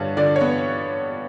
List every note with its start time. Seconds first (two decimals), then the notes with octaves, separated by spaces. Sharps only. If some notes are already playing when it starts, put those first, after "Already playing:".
Already playing: G2 D3 C#5
0.17 D3 D5
0.36 C#5
0.41 B3